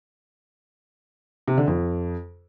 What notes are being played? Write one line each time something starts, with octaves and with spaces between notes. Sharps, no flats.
C3
D3
F2